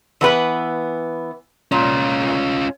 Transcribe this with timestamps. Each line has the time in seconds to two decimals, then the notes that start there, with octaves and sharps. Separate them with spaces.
0.21 E3 B3 B4
1.72 A#2 C#4 F4